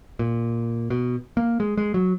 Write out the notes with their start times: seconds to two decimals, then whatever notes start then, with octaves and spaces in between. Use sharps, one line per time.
0.19 A#2
0.90 B2
1.37 A#3
1.60 G#3
1.77 G#3
1.94 F#3